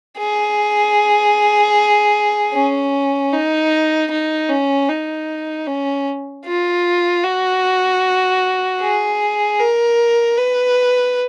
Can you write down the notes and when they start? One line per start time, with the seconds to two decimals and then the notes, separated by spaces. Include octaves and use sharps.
0.18 G#4
2.54 C#4
3.33 D#4
4.11 D#4
4.50 C#4
4.89 D#4
5.67 C#4
6.46 F4
7.24 F#4
8.81 G#4
9.60 A#4
10.38 B4